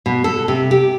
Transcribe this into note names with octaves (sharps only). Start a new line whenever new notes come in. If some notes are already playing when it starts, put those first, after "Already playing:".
B2
A4
C3
G4